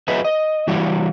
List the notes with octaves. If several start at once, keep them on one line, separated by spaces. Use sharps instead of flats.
F#3 G#4 B4 D#5 E5
D#5
E3 G3 E4 F#4 C#5 D5